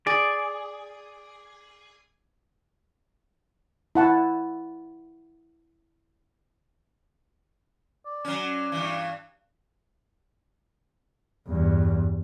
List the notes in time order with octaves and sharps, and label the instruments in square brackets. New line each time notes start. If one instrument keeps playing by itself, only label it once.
[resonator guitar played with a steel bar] G#4 [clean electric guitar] D5
[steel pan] E4 F#5 A5
[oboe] D5
[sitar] F#3 C#4
G2 E3
[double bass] E2 G2